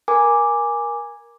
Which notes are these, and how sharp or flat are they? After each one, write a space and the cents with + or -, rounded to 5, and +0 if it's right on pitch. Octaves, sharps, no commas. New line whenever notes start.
A#4 +20 G#5 -10 D6 +0